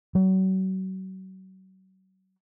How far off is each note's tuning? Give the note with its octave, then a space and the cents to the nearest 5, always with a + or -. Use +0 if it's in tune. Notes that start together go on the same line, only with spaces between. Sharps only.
F#3 +35